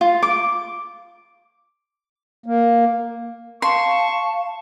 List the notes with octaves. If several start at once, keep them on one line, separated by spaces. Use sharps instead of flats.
F4
D6
A#3
F5 A5 C6 C#6